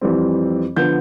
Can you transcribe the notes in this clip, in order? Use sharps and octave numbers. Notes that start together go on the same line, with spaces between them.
F2 E3 G3 C4
D3 F3 B3 G6